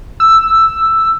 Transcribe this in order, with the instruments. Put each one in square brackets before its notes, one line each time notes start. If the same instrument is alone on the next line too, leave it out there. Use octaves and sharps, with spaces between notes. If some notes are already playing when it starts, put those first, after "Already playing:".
[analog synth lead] E6